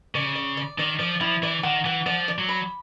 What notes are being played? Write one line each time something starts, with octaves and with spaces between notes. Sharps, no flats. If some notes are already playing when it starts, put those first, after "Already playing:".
C#3 D5
D5
D5
D#3 D5
F3 D5
F3 E4
E3 D5
D#3 F#5
E3 F#5
F3 D5
D5
F#3
B5